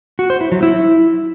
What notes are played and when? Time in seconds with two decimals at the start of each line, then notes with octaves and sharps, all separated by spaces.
0.19 F#4
0.30 C5
0.41 E4
0.52 F#3
0.63 E4